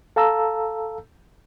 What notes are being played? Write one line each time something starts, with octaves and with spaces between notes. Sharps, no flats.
A4 F5 A5 A#5 E6